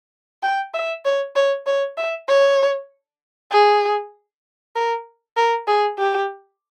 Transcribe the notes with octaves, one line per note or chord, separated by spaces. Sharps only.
G5
E5
C#5
C#5
C#5
E5
C#5
G#4
A#4
A#4
G#4
G4